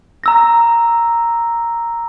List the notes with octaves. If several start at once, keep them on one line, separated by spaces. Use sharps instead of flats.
A#5 E6 A#6